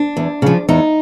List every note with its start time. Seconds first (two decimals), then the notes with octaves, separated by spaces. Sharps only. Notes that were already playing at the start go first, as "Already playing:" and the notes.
Already playing: D4
0.17 E2
0.42 C#3 F3
0.69 E2 D#4